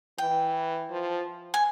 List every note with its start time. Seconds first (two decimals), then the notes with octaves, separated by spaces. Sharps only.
0.18 E3 G5
0.90 F3
1.54 G#5